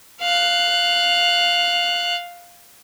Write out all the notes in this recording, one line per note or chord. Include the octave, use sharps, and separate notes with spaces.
F5 F#6